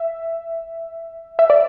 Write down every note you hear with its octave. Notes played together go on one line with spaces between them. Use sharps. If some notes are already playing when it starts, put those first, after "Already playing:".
Already playing: E5
E5
D5